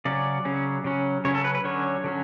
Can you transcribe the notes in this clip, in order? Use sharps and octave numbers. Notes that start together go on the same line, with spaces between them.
C#3 F#3 C#4 D5
C#3 F#3 C#4
C#3 F#3 C#4
C#3 F#3 C#4 C#5
A4
B4
B4
D3 F#3 C#4 C#5
D3 F#3 C#4